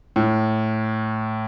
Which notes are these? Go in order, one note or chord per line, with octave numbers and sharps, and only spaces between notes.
A2